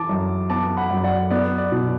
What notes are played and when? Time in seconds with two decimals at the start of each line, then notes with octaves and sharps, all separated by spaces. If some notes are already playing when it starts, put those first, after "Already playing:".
Already playing: E3 A5 D6
0.09 F#2
0.50 B3 A5 D6
0.77 F#5 B5
0.91 F#2
1.04 D5 F#5
1.30 B3 D5
1.58 D5
1.72 B2